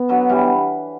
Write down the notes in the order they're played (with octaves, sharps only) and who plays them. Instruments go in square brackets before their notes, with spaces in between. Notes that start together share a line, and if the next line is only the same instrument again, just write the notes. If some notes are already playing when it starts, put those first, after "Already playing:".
Already playing: [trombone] B3
[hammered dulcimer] D3 F#3
E3 G3